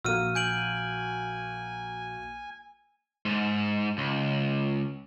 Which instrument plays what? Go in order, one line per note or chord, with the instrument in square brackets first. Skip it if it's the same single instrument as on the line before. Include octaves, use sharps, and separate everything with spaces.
[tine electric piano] A#1 [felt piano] A#3 F#4 [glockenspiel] E6 F6 D#7
[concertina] G#5 [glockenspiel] G6 D7 F#7
[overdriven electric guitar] G#2
C#2